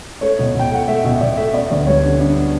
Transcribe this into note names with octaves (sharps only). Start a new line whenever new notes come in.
A3 C#5
B2
B2 G5
A3 F#5
A3 E5
B2 E5
B2 D5
A3 E5
B3 D5
D2 D5
G3 C#5
D3 D4
B3 D4